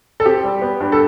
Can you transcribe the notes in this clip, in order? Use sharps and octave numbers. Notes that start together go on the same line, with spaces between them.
A4
C4 G4
G3
B3
G2
A4